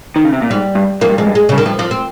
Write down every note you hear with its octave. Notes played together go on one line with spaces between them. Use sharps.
D#3
C#3
C3
A#2
G#2 G3
G2
F2 A#3
G2
F2 G#3
G2
G#3
C#3
G2
D#3
G2 F3
F2 F3
C4